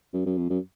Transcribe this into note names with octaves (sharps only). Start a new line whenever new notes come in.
F#2
F#2
F2
F#2